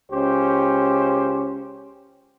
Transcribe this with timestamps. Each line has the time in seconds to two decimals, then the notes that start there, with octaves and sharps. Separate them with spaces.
0.11 C#2 C#4 G4 C5